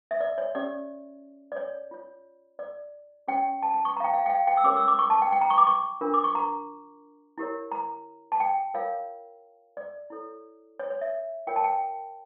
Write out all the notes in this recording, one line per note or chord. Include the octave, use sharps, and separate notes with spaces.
E5
D5
C#5
C#4 G4 C#5 D5
D5
C#5
F4 C#5
D5
C#4 G4 C#5 G5
A5
A5
C#6
A#5
F5
G5
F5
G5
F5
G5
E6
C#4 G4 A#4 C#5 D6
E6
D6
C#6
A5
G5
G5
A#5
C#6
D6
C#6
D4 F4 A#4
D6
C#6
A#5
E4 G4 A#4 C#5
A#5
A5
G5
F4 A#4 C#5 F5
D5
E4 A4 C#5
C#5
C#5
E5
F4 A#4 C#5 G5
A5
G5